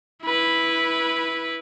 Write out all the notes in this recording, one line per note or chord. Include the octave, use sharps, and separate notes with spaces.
E4 B4